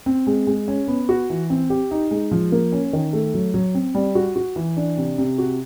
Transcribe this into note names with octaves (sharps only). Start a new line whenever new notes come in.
C4
G#3
G#3
C#4
B3
F#4
E3
C4
G4
D#4
G#3
F3
A#3
C#4
D#3
A3
F#3
F#3
C4
G3
F#4
F#4
E3
D4
C3
C3
F#4